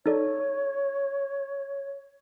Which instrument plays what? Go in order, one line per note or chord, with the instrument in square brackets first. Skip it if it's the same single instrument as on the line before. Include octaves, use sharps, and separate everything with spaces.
[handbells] D#4 A4 D5 [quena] C#5